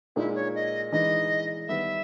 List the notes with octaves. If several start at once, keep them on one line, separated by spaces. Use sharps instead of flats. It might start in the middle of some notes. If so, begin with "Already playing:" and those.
A#2 G#3 D#4 E4
C#5
D#5
E3 G#3 D#4 D#5
D#3 G3 B3 E5